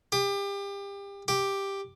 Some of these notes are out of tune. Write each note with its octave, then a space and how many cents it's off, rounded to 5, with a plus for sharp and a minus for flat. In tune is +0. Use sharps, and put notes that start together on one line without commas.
G4 +30
G4 +5